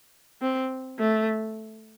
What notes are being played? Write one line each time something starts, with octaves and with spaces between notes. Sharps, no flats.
C4
A3